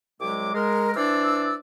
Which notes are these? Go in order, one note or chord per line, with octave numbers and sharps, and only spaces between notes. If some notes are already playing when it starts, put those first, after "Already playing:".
C2 F#3 G#3 D6
G#3 A#4
E3 D4 C5 D5 E6